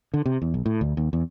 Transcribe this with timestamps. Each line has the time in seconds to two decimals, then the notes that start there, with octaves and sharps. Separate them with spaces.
0.14 D3
0.26 C3
0.42 E2
0.54 B1
0.66 A2
0.81 D2
0.97 D#2
1.13 E2